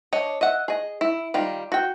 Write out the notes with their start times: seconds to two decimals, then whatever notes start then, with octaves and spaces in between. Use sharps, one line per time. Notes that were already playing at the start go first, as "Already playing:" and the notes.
0.13 D4 C#5 D#5
0.41 D#5 E5 F#5
0.68 G#4 D#5
1.01 E4
1.34 D#3 G3 F4
1.72 F#4 G5